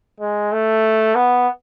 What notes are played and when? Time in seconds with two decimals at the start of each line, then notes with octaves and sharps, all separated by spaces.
0.20 G#3
0.52 A3
1.15 B3